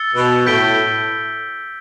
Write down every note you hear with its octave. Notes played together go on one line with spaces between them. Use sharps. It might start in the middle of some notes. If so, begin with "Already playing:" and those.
Already playing: E6 A6 C#7 G7
B2
A2 G6 B6 D7 G7